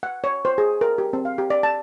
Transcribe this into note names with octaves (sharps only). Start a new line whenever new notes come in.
F#5
C#5
C5
G#4
A#4
G4
C4
F5
G4
D5
A5